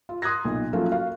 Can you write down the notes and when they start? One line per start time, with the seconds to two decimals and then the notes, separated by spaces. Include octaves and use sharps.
0.09 F4
0.22 C6 D#6 F#6 G#6 A#6
0.45 B1 A#2
0.73 F3 F#3 A3 A#3 C#4 F4
0.91 F#4 F5